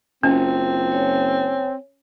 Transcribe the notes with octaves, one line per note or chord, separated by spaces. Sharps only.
F#1 C4 C#4 F4
C#5 G#5